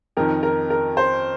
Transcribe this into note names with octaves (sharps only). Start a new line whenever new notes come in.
F2 D#3 A#4
A#4
A#4
C5